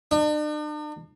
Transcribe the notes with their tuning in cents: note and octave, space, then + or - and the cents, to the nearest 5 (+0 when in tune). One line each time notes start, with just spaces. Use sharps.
D4 +45